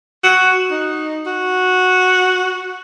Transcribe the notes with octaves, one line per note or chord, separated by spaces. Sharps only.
F#4
D#4
F#4